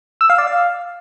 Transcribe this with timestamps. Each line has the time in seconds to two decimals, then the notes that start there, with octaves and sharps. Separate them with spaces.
0.21 E6
0.30 F5
0.38 D5
0.47 F5